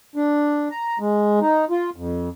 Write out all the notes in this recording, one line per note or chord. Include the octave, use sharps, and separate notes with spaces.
D4
A#5
G#3
D#4
F4
F2